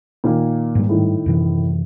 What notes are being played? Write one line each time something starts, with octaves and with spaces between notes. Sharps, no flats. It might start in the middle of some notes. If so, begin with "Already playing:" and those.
A#2 D#3 A#3
G#2 G3
A2 D#3
F#2 C3 E3